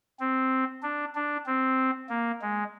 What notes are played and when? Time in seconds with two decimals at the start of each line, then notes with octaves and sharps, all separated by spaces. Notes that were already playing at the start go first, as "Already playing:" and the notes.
0.20 C4
0.83 D4
1.15 D4
1.46 C4
2.10 A#3
2.42 G#3